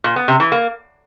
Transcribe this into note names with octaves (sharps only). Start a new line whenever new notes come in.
A#2
B3
C3
E3
A#3